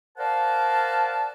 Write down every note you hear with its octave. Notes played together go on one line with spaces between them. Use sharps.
A#4 C5 D5 F5 F#5 A5